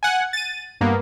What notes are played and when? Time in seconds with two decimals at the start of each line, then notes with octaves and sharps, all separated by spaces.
0.03 F#5 G#5
0.33 A6 D#7
0.81 G2 A#3 B3